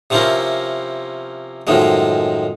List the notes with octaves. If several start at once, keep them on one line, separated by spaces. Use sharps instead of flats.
C3 F3 C4 C#4 E4 A#4
F#2 A2 D#3 F3 G#3